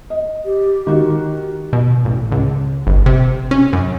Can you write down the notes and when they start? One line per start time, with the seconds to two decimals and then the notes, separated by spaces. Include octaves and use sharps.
0.10 D#5
0.45 G4
0.87 D#3 F#4
1.73 B2
2.05 A1
2.32 C#2
2.87 G1
3.06 C3
3.51 C#4
3.73 F#2